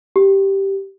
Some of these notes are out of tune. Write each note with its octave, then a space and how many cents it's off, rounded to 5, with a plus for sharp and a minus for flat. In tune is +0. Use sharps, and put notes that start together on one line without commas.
G4 -5